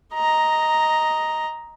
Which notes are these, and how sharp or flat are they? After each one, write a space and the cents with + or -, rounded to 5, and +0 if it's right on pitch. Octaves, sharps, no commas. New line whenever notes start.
D#5 +5 A#5 +0